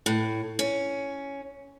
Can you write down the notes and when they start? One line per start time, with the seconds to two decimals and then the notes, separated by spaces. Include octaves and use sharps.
0.06 A2
0.59 C#4